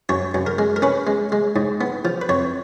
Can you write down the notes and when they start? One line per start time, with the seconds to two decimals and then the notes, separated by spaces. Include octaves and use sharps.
0.09 F#2 C#5
0.34 F#2
0.46 A#4
0.58 G#3
0.76 A#4
0.82 C#4 B4
1.07 G#3
1.32 G#3
1.56 G#2
1.81 B3
2.05 F3
2.21 B4
2.29 F2 C#5